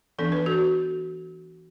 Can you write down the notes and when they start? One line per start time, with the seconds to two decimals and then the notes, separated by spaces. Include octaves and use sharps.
0.19 E3 B3 D4 A4
0.32 B4
0.46 F#4 A4